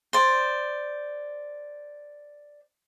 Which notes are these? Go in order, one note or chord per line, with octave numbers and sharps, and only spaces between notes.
C5 D5